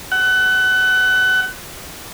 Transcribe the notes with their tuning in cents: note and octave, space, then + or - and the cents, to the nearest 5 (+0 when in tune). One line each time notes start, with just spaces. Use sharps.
F#5 +25